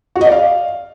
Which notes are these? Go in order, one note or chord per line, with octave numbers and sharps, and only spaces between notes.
F#4
D#5
D5
F5